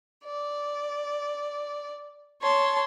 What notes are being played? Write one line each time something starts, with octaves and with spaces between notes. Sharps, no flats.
D5
C#5 A5 C6